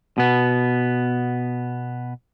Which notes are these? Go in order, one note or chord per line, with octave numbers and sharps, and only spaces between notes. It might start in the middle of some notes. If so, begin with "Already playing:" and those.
B2 B3